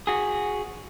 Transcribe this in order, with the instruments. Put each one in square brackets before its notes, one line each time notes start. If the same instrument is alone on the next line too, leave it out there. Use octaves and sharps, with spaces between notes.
[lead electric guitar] F#4 G#4